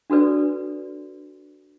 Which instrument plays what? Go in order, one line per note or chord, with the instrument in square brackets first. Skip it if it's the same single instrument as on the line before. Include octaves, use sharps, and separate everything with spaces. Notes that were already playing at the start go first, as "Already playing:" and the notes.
[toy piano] D4 F#4 A4 B4 D5